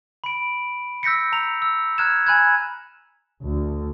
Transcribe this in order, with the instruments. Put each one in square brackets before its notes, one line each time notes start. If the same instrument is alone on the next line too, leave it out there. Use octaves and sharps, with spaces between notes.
[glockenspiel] B5 D7
E6 G6 A#6 B6 C#7
A#5 F7
E6
A#5 F6 F#6 G#6 E7
G#5 B5 F#6 G#6
[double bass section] D2